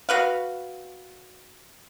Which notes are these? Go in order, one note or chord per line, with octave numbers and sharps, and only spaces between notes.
F#4 B4 F5